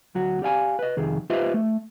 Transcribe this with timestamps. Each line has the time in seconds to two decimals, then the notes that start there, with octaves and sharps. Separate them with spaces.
0.15 D2 F#3 F#4
0.42 G4 D5 F5 G#5
0.79 B4 D#5
0.97 C2 F2 D#3 G#4
1.30 F4 G4 B4 C5 D#5 E5
1.54 A3